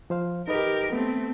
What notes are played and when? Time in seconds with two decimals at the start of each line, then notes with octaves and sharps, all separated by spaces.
0.10 F3 C5 F5
0.48 D#4 G4 A#4 B4 D#5
0.92 A3 B3 C4